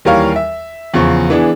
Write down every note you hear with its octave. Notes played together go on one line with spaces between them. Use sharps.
D#2 E3 G3 A#4 C#5 F5
E5
E2 C#3 F3 C#6
E3 B3 D4 G#4